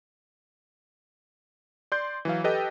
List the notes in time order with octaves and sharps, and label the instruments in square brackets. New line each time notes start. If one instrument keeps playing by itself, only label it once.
[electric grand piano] D5 C6 G6
E3 F#3 F5
G4 A4 B4 D#5 G5